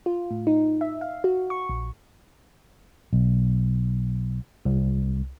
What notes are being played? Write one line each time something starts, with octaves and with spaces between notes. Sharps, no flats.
F4
A2
D#4
E5
F5
F#4
C#6
A#1
B1
C2